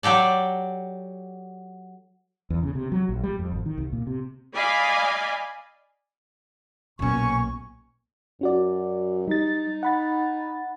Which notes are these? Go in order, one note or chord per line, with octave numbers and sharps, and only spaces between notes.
F#3 G4 A4 D5
E2
C#3
C3
F#3
A#1
G3
F2
G#1
D#3
C2
A#2
C3
D5 D#5 F5 G#5 B5
B1 A#2 C#4 C#6
F#2 C#4 F#4 D5
G3 D#4 A6
F#5 B5 A6